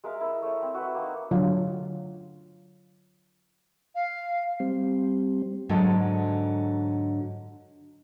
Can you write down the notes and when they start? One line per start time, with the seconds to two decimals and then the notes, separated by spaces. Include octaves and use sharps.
0.04 G#3 A#4 E5 F5
0.21 E4 A#4 D#5 E5
0.42 A3 C#5
0.62 C4
0.74 F#4 B4
0.94 A#3 C4 D#4
1.31 D3 F#3 F4
3.95 F5
4.60 G3 C4
5.69 G#2 D3 F#3 G#3 A4 G5